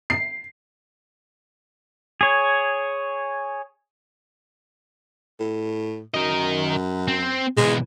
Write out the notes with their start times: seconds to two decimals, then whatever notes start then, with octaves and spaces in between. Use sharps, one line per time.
0.10 C7
2.21 G#4 C#5
5.40 A2
6.14 F#2 A#4 D#5
7.08 C4
7.57 B1 E3 G#3